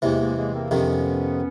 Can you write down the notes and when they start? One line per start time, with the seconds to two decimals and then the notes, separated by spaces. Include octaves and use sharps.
0.02 E2 C3 E3 G#3 A#3
0.20 G#3 A#3
0.37 G#3 A#3
0.54 A#3 C4
0.71 F2 C3 D#3 B3 C#4